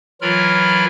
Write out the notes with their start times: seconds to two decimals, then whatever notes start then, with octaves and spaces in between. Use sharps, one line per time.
0.21 E3 F#3 F4 A#4 B5 F6